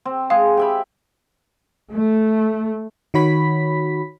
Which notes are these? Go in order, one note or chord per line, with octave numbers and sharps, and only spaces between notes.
C4
G#3 G#4 F5
G4 E5 B5
A3
D#3 F#4 C#5 B5 B6